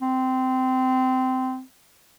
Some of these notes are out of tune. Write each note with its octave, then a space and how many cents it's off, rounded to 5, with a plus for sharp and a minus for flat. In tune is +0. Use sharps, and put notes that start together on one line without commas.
C4 -20